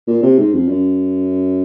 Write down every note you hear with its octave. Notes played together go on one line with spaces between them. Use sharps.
A#2
C3
G#2
F2
F#2